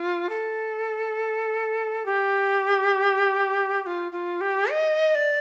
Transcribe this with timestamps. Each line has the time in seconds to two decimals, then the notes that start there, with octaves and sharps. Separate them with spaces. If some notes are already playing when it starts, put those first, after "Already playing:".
Already playing: F4
0.29 A4
2.05 G4
3.82 G4
3.86 F4
4.12 F4
4.41 G4
4.70 D#5
5.14 D5